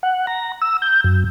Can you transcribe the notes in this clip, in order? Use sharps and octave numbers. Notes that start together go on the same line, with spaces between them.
F#5
A#5
E6
G6
F#2